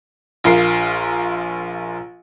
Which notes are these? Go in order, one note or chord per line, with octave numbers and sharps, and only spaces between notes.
A#1 F4 A#4 C7